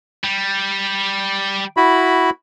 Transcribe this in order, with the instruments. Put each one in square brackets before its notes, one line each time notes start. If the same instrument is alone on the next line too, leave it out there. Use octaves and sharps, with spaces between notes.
[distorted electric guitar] G3
[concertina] E4 F#4 B5